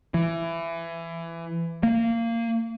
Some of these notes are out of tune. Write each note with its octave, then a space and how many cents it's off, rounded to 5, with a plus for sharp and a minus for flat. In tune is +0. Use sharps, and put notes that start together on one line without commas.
E3 +20
A#3 -20